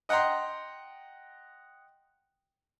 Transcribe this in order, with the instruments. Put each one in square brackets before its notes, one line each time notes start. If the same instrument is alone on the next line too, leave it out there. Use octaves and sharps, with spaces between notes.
[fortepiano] D#5 F#5 G5 A#5 C6